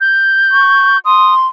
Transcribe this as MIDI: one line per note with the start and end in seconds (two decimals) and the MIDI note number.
0.01 0.99 91
0.51 0.97 85
1.05 1.46 84
1.05 1.34 87